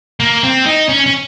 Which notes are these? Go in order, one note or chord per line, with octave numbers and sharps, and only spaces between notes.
A#3
C4
D#4
C#4
C#4